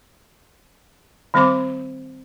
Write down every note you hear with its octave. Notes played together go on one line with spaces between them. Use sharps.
D#3 G3 C4 C5 C6 D6